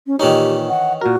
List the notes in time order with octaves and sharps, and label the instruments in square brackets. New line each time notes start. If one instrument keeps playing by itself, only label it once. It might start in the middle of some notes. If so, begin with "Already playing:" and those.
[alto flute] C#4
[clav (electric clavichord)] A#2 D#4 [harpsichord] D#3 E3 C#4 [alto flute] G4
[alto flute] F#5
[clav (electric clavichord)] A#2 A#4 [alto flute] F#4